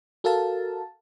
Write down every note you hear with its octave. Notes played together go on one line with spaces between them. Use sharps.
F#4 A4 A#4 F5 A5